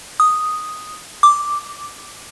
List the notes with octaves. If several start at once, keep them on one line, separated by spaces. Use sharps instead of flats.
D#6
D6